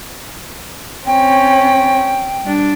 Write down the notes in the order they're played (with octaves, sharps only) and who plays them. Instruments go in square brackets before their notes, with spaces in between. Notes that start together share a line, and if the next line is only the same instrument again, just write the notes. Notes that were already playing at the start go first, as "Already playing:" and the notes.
[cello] C4 C#4 [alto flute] G5
[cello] G3 D4